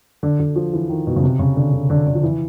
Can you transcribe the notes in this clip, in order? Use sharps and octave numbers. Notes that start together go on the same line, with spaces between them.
D3
D3
F3
E3
D#3
B2
C#3
C3
C#3
D3
D3
D3
D3
F3
E3